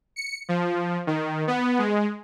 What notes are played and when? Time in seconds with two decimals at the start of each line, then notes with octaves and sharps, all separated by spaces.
0.16 C#7
0.49 F3
1.07 D#3
1.48 B3
1.79 G#3